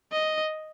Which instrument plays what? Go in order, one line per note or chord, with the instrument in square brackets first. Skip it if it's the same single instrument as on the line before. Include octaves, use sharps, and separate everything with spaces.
[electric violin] D#5